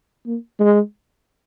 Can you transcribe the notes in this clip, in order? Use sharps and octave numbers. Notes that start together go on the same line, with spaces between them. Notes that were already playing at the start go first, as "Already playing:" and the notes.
A#3
G#3